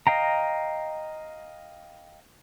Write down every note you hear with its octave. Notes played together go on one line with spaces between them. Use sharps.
D#5 F5 G5 A#5